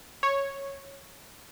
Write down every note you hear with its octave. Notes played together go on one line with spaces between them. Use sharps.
C#5